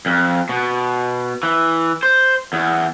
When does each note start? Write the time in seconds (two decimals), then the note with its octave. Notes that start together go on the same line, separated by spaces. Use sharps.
0.06 F2
0.49 B2
1.43 E3
2.03 C5
2.53 E2